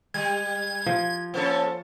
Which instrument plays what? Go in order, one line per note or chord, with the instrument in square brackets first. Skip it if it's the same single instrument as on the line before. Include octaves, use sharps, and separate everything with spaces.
[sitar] G3 [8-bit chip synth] G#6
[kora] F3
[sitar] A#3 C#4 A4 [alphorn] C5